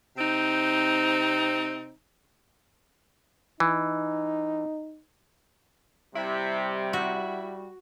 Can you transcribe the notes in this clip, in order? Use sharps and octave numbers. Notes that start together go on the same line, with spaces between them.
C3 C4 D#4
E3 D#4
C3 G3 E4
E4 F#4